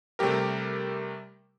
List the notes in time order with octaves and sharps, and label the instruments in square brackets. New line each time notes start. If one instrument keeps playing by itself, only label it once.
[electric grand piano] C3 G3 A3 G4 A#4